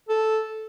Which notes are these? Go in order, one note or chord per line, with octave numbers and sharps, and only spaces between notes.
A4